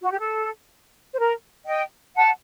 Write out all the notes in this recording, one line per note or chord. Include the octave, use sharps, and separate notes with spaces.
F#4
G4
A4
C5
A#4
D#5 G5
F#5 A5